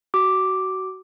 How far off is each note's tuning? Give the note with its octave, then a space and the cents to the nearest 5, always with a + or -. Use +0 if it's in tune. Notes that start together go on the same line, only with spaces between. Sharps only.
F#4 +25 D6 +0